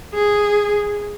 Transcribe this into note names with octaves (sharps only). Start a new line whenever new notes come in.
G#4